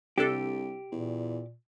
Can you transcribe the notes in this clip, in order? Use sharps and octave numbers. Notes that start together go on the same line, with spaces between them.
C2 C3 D4 G4 A4
E2 A#2